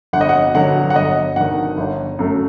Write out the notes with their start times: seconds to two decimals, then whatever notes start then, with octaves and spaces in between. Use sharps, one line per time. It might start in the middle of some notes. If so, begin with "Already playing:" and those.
0.13 G1 F#5
0.21 D#5
0.29 F#5
0.54 G2 D3 F#3 F#5
0.90 F#5
0.96 G1 D#5
1.36 G2 D#3 F#5
1.78 G1
2.19 F#2 F#3 A3